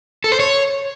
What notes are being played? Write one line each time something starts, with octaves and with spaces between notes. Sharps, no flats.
A4
C5
C#5